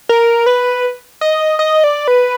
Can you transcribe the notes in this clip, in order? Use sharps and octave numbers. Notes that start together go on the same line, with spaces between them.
A#4
B4
D#5
D#5
D5
B4